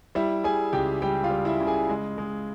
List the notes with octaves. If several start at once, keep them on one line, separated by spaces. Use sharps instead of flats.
G3 E4 E5
G3 G#4 G#5
C#2 G4 G5
G3 G4 G5
F4 F5
G3
E4 E5
C#3
G#4 G#5
G#3
G#3